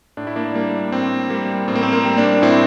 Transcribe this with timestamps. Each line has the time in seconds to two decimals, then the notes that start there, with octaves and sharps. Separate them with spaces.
0.17 A2 D4
0.27 E4
0.36 A#3 D4
0.55 G3 A#3
0.92 A2 C4
1.30 G3 A#3
1.68 A2 C4
1.75 A#3
1.83 C4
1.93 A#3
2.05 G3
2.17 A#3 D4
2.42 A2 C4 E4